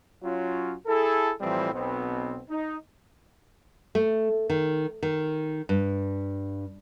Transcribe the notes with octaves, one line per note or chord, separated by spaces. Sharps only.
F#3 C#4 F4
E4 G#4 A4
A2 E3 F3 G3 C4
B1 B2 B3 C4
D#4
A3
D#3
D#3
G2